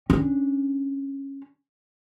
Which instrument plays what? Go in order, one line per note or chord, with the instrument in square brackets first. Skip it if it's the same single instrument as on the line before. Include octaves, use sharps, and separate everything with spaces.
[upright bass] C#4 D4